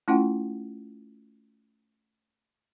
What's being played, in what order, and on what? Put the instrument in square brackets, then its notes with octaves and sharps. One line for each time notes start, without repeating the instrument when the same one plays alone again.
[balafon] A3 C#4 E4 F4 F#5 G5